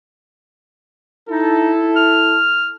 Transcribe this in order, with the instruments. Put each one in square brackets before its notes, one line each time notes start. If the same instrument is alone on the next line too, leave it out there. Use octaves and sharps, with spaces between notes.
[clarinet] D#4 [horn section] E4 A4
[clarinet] F6